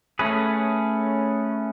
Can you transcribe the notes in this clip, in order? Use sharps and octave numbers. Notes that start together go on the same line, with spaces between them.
A3 C#4 G#4 B4